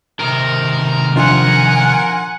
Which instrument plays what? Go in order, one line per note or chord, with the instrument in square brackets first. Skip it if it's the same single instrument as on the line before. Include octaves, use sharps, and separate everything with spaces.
[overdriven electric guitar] C3 D#3 [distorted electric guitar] A#4
[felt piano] F3 D4 F4 [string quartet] F#5 G#5